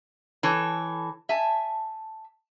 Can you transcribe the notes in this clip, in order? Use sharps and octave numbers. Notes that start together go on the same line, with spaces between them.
E3 A4 C#5
E5 G#5 A5